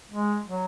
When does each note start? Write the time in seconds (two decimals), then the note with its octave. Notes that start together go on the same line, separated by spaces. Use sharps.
0.11 G#3
0.46 F#3